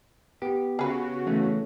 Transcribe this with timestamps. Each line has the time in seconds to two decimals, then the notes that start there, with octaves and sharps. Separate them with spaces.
0.42 B3 G4
0.79 C#3 F#4 G#4 B4
1.26 E3 A3 C#4